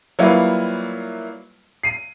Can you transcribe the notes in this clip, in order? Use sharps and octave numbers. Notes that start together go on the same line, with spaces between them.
F#3 G3 A#3 E4 F4 B4
C7 D#7